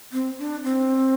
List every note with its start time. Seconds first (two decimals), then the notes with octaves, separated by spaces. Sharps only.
0.13 C4
0.39 D4
0.64 C4